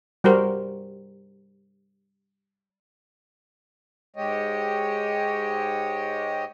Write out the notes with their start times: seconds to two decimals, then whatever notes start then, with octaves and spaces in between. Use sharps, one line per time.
0.24 G3 F#4 A#4 C5
4.16 G#2 G#3 G4 C#5 D#5